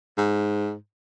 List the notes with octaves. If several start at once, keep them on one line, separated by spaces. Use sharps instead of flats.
G#2